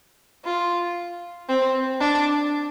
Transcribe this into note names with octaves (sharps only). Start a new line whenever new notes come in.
F4
C4
D4